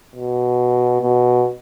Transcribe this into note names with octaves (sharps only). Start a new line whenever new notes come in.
B2
B2